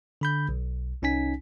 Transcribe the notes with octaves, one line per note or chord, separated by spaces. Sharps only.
D3 B5 G6
B1
C2 C#4 D#4 G#5 B6